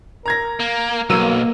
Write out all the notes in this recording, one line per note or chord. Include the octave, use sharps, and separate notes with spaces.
A#4 A#5 G#6 A#6
A#3
B1 F#3 A#3 E6 D#7